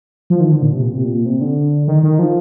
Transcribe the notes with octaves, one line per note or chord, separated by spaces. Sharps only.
F3
D#3
D3
A#2
C3
A#2
C3
A#2
C3
D3
D#3
D#3
F3